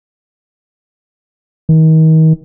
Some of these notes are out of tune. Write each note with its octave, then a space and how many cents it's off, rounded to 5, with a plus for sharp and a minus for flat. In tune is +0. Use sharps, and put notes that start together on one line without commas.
D#3 +35